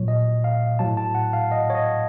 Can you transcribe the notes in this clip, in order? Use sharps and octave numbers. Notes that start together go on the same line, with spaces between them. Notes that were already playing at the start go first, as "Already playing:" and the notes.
Already playing: A#2 F#3 C#5
D#5
F5
A2 F#3 A5
A5
F#5
F5
D#5
C#5
D#5